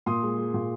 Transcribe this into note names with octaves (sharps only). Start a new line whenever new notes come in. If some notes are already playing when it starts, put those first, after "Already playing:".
A#2 C6 D#6
G#3
G#3
A#2